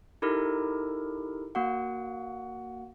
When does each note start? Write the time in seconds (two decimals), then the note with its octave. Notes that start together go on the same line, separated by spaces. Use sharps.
0.22 D#4 E4 G4 A4 A#4
1.55 A#3 F#4 F#5